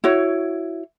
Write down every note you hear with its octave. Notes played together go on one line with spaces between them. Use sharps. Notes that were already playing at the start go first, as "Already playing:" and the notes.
E4 F#4 C#5